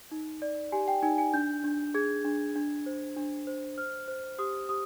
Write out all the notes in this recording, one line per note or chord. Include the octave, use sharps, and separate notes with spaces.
D#4
D5
G4 G#5
G5
D#4 G#5
G#5
D4 G6
D4
G#4 G#6
D4
D4
C5
D4
C5
C5 F6
C5
G4 D#6
G4 D#6